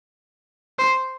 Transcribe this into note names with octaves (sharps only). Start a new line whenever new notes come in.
C5